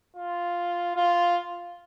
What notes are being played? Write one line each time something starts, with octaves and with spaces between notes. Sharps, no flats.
F4
F4